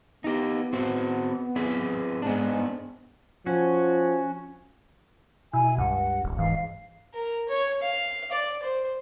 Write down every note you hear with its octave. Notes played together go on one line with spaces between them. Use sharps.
B3 D#4 G4
C4 F#4 C5
C4 G#4 B4
G#2 B3 D4
F3 C#4 F#4
B2 E4 G#5
C#2 G2 F#5
D#1
G#2 E3 F5
A#4
C#5
F5
D5
C5